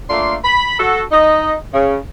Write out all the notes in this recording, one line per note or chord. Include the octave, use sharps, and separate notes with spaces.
A3 A#3 D4 F4 F5 C6
B5
F#4 A4
D#4 D#5
C#3